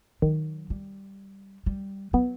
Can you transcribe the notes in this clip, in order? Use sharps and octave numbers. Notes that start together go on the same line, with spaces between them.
D#3 F#3
G3
G3
F#3 B3